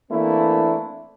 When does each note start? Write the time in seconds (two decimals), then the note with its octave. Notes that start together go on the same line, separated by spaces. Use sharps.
0.10 E3 A3 A#3 C4 D4 E4